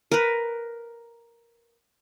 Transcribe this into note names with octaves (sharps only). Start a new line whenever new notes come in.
A#4 B4